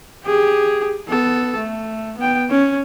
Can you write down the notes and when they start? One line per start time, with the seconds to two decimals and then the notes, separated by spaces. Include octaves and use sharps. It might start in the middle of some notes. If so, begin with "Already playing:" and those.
0.24 G4 G#4
1.08 B3 A4
1.58 A3
2.18 B3 G5
2.50 C#4